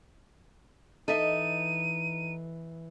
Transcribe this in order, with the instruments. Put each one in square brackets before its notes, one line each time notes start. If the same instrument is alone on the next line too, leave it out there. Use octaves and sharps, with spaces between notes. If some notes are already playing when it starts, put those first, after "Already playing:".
[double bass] E3 [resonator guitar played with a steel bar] D#4 [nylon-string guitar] A4 E5 [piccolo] D#7